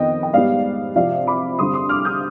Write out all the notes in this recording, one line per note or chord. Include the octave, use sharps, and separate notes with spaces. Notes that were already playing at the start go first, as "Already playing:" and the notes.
Already playing: F2 D#3 B3 D#5 G5
G5
G#2 G3 B3 D5 F5
C3 F3 C4 D5 F5
B5 D6
G2 D3 G3 C4 C6 D#6
C6 D#6
D6 F6
D#6 G6